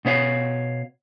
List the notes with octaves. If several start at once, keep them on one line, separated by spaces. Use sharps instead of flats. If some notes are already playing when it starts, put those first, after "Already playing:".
B2 B3 C#5 F5